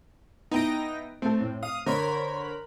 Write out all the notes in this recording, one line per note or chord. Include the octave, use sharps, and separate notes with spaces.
B3 D#4 E4 G5 A#6 D7
A3 C4 A4
A2
F5 D#6
D3 A#4 C5 C#5 B5